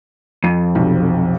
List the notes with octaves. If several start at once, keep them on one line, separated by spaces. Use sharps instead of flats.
F2
B1 C3